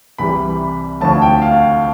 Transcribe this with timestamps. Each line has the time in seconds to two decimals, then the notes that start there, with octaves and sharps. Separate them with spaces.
0.18 C2 C3 E3 G3 B5
1.01 D2 D3 F3 A3 A5
1.22 G5
1.42 F5